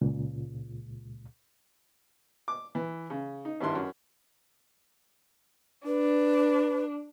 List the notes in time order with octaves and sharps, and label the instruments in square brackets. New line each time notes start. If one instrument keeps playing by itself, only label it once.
[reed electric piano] C#2 A#2
[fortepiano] D6
E3
C#3
D#4
G#1 G2 E4 C6
F#2
[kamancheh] D4 [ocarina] B4